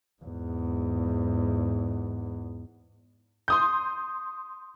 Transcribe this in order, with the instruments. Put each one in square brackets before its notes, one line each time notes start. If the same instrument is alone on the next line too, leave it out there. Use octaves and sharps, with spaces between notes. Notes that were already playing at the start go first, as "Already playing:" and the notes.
[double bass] E2 G#2
[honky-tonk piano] C6 D#6 G6